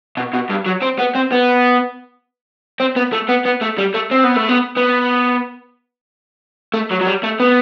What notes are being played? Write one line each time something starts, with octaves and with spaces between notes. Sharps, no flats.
B2
B2
G2
F#3
C4
B3
C4
B3
C4
B3
A3
B3
B3
A3
G3
A3
C4
B3
A3
B3
B3
A3
F#3
F#3
G3
A3
B3